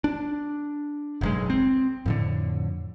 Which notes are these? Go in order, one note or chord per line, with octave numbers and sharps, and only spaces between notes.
D4
F#1 B1 G#3
C4
F2 A2 D3